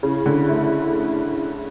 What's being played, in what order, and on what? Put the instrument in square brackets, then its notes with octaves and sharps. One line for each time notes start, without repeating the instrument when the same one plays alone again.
[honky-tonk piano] C#3 [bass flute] E4
[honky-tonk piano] D3
A3